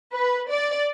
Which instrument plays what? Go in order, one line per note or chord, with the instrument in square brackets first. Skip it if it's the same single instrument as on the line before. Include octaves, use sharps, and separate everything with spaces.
[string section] B4
D5